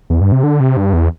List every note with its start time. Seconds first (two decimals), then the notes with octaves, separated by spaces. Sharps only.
0.10 E2
0.21 G2
0.32 C3
0.43 D3
0.60 C3
0.77 G2
0.93 E2